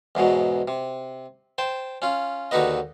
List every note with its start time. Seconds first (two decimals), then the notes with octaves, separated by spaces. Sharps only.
0.15 E2 G#2 B2 F#3
0.68 C3
1.58 C5 G5 A5
2.02 C#4 F4
2.51 D#2 D3 D#4 F#4 B4 D#5